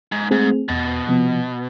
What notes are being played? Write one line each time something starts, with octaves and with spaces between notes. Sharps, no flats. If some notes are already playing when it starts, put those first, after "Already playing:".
G#2
G#2 A3 C4 G#4
E2 B2
C3 F3 B3